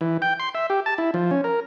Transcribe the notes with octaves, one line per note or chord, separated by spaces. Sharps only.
E3
G5
C6
E5
G4
A5
E4
F3
C#4
A#4